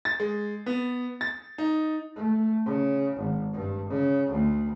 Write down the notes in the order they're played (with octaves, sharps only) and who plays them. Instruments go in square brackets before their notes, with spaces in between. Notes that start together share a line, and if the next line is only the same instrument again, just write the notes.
[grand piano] A6
G#3
B3
A6
D#4
[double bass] A3
C#3
G#1
G2
C#3
D2